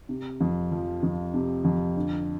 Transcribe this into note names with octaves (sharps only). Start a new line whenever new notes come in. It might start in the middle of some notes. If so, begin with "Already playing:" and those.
C3
F2
F3
F2
C3
F2
D3